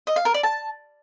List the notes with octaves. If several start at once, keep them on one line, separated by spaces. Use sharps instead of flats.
D#5
F5
A#4
D5
A5